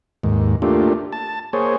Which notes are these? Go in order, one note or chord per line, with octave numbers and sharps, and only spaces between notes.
D#2 G#2
A3 A#3 D4 F4 G4
A5
A#3 G#4 C5 C#5